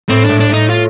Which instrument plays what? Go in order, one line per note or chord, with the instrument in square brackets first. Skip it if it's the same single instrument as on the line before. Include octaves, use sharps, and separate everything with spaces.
[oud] A2 [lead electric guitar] C4
[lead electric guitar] D4
[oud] A2
[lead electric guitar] D4
[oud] A2 [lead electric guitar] D#4
[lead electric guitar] F4